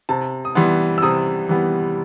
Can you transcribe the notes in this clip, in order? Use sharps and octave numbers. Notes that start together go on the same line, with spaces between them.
C3 A5
D#6
E3 G3 B3 C6
E6
C3 D#6
E3 G3 B3